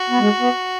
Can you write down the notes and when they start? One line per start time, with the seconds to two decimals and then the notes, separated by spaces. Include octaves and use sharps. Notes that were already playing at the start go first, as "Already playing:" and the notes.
Already playing: F#4
0.10 B3
0.20 G#3
0.40 B3